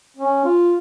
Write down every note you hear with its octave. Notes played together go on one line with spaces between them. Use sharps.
C#4
F4